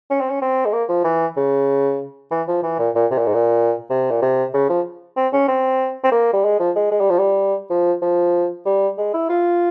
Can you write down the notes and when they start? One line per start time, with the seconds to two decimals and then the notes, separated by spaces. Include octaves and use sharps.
0.10 C#4
0.20 C4
0.30 C#4
0.42 C4
0.65 G#3
0.73 A#3
0.89 F3
1.04 E3
1.37 C#3
2.31 E3
2.48 F3
2.63 E3
2.79 A#2
2.95 A#2
3.11 C3
3.18 A#2
3.26 G#2
3.34 A#2
3.90 C3
4.11 A#2
4.22 C3
4.54 C#3
4.69 F3
5.17 C4
5.33 C#4
5.48 C4
6.04 C4
6.12 A#3
6.33 G3
6.44 G#3
6.59 F3
6.75 G#3
6.91 G#3
7.00 G3
7.10 F3
7.19 G3
7.70 F3
8.02 F3
8.66 G3
8.98 G#3
9.14 E4
9.29 F4